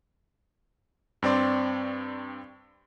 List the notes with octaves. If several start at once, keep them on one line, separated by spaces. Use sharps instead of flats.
G2 C4 D5 C6